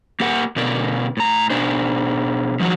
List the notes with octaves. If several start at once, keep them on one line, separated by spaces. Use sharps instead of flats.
A#3 G4 A#4 F#5
B2 D3 A#4 D5
A2 A#5
B2 D4 C5
D#3 F3 F#3 F#4